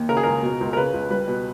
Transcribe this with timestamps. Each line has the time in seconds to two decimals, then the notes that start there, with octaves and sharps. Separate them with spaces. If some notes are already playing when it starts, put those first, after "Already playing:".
Already playing: D#2
0.09 C#3 A#4
0.17 G#4
0.23 C#2 A#4
0.42 B2
0.61 C#2
0.73 A#4
0.77 C#3 B4
0.93 C#2
1.10 G3 B4
1.28 B2